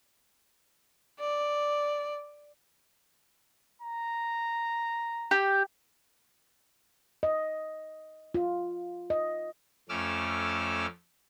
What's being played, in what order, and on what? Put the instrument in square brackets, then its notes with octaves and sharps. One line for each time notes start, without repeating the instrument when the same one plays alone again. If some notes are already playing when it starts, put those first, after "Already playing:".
[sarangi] D5
[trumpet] A#5
[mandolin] G4
[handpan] D#5
F4
D#5
[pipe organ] F2 A3 C#4 D6 E6 F6